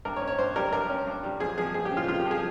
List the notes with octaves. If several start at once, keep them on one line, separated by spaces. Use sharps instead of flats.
G2 A#4
C#5
C#4
C#5
G2 C5
G3 A#4
G2 A#4
C#4
G2
G3
F2 G#4
F3 G#4
F2 G#4
G4
C#3
F4
F2 F4
G4
F3
G#4